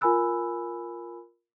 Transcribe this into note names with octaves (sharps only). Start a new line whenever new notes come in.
F4 A#4 G#5 B5 E6 F#6